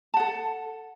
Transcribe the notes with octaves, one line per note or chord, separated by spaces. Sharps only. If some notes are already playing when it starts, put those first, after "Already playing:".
A4 F#5 A5